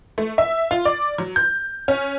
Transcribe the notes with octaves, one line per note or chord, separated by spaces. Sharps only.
A3
E5
F4
D5
F#3
G6
C#4